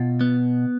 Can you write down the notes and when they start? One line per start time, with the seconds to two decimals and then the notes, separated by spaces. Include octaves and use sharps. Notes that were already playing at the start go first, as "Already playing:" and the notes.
Already playing: B2 F4
0.21 B3